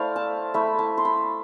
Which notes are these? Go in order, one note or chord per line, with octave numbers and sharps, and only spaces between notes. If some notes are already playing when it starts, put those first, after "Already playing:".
Already playing: A3 E4 C5 D5 F5
A5
A3 E4 B5
A5
C6
B5